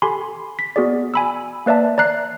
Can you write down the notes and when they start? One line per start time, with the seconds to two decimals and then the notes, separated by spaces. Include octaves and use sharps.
0.02 G4 A4 G#5 B5 C6
0.59 B6
0.76 B3 F#4 G#4 D5
1.14 G#5 B5 E6
1.66 A#3 B4 D5 E5 A5
1.98 D5 A#5 F#6 C7